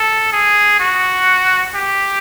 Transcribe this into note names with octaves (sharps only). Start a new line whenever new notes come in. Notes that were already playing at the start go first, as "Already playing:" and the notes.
Already playing: A4
G#4
F#4
G4